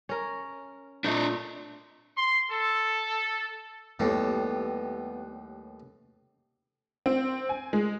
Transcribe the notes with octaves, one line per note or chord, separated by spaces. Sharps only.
C#4 A#4
A#2 A3 D4 C5 D#5
C6
A4
D#2 A2 G3 B3
C4
G#5
G#3